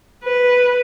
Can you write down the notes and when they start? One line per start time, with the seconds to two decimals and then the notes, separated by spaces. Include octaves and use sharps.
0.24 B4